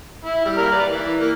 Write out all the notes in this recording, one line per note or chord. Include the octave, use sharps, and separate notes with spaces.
E4
G3
G3 A#3 A#4
B4 D5
E3
A#3